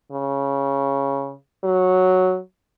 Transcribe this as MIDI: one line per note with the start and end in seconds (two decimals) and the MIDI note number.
0.12 1.34 49
1.64 2.38 54